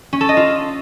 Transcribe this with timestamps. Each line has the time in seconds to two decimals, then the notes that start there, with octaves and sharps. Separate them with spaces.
0.13 C#4
0.21 A4
0.29 D#5
0.37 F4